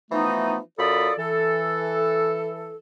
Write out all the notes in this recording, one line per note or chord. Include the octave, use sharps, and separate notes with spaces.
E3 F3 A3 B3 D#4
F#2 F4 A4 D5 B5 D#6
E3 A4